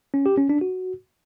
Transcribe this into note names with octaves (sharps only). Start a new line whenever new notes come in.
C#4
G4
C#4
D4
F#4